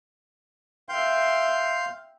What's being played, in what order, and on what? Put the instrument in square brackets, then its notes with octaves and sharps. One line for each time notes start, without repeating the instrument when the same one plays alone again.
[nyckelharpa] E5 G5 [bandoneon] F5 C6 G6